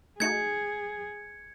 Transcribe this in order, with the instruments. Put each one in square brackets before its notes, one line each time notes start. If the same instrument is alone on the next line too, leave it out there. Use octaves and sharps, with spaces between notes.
[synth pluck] A3 D#4 F#4 [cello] G#4 [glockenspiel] G#6 C#7